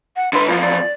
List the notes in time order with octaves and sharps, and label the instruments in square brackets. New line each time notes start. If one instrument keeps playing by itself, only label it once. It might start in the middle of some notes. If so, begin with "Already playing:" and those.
[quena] F#5
[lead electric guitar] D3 B4 [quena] C6
[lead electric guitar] E2 F3 [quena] F4
[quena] D5